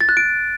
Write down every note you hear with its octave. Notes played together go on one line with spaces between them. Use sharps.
A6
F#6
D7